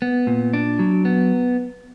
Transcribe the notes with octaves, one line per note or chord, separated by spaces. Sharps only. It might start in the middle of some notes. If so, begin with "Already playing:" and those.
B3
A#2
D4
F#3
B3